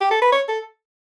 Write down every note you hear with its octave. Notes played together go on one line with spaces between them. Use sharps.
G4
A4
B4
C#5
A4